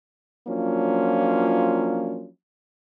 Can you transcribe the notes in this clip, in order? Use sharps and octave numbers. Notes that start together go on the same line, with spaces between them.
F3 F#3 A#3 C#4 D4 F4